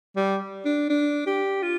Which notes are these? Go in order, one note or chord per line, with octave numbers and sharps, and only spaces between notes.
G3
D4
D4
G4
F4